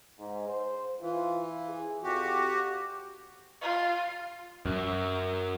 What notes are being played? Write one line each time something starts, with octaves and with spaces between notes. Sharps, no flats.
G#2
C5
E3 F4
G#4
F2 F#4 G4
F4
F#2